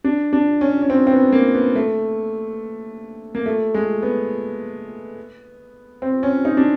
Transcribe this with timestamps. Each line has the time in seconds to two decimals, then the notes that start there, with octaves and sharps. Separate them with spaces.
0.04 D4
0.33 D4
0.61 C#4
0.82 C#4
0.90 C4
1.07 C4
1.12 B3
1.32 A#3
1.54 B3
1.75 A3
3.35 A#3
3.46 A3
3.74 G#3
4.03 B3
6.02 C4
6.23 C#4
6.45 D#4
6.57 D4